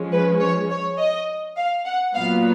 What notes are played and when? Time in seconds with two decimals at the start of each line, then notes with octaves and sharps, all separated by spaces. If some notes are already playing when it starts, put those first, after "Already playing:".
Already playing: F3 G#3 C#4
0.12 B4
0.40 C#5
0.70 C#5
0.98 D#5
1.57 F5
1.86 F#5
2.14 A#2 F#3 B3 F5